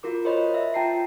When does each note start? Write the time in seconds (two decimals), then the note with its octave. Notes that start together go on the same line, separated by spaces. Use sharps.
0.03 F4 F#4 A#4 D6
0.24 A#4 C5 C#5 D#5 B5
0.54 E5
0.74 F4 G5 A5 A#5 C7